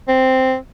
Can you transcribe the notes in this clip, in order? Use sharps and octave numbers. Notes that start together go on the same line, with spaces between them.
C4